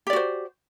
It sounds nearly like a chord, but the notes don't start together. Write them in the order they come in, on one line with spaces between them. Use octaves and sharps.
G4 D5 F#4 C5